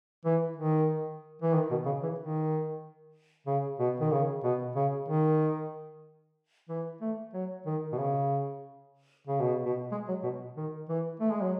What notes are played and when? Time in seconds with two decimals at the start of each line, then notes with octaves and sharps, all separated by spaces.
0.25 E3
0.56 D#3
1.42 E3
1.54 D#3
1.70 B2
1.86 C#3
2.03 E3
2.19 D#3
3.47 C#3
3.79 B2
4.00 D#3
4.12 C#3
4.44 B2
4.76 C#3
5.08 D#3
6.69 E3
7.01 A3
7.34 F#3
7.66 D#3
7.93 B2
7.98 C#3
9.27 C#3
9.40 B2
9.65 B2
9.92 G#3
10.08 F#3
10.23 B2
10.57 D#3
10.89 E3
11.20 A3
11.31 G#3
11.41 F#3